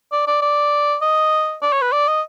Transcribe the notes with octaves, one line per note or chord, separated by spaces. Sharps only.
D5
D5
D5
D#5
D5
C#5
B4
D5
D#5